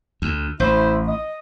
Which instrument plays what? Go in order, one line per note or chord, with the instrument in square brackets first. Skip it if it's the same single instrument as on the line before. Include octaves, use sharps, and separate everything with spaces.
[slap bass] D2
[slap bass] A1 [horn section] E4 C5
[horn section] D#5